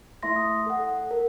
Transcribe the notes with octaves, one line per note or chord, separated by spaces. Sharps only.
A3 E4 E5 C6 A#6
D#6
A4 F#5
A#4